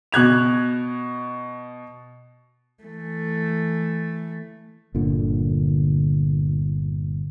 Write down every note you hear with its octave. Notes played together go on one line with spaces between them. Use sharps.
B2 F#6 G#6 F7
E3 A3
G1 A#2 D3